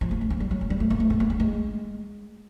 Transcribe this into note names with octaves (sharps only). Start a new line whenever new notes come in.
F3
A#3
A3
A#3
G3
F#3
F#3
G3
A3
A#3
A3
A3
A#3
A3
G#3